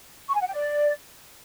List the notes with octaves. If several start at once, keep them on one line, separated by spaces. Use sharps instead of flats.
C#6
G#5
F#5
G5
D5